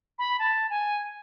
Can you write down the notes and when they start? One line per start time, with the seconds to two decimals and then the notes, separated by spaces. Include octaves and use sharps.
0.19 B5
0.39 A5
0.70 G#5